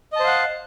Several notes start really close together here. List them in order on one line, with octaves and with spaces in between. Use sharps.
D#5 A5 C5 F5 F#5